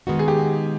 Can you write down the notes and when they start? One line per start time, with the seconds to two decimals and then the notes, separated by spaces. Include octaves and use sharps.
0.07 D#3 G#3 B3 D#4 F#4
0.19 G#4
0.28 G4